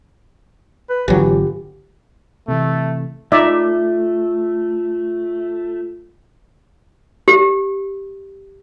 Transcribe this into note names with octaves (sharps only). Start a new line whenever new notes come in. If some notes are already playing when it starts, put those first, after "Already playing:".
B4
G#1 D3 E3 F#3 F4 G4
C3 E3 A3
A3 D#4 F4 D5 E5
G4